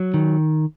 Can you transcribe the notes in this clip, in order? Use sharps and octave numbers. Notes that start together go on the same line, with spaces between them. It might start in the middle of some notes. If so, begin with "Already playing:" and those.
Already playing: F#3
D#3